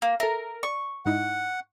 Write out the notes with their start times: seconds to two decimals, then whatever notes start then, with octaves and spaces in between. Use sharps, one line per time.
0.02 A#3
0.20 A4 A#4 E5
0.63 D5 C#6
1.06 G#2 D#4 E4 F#5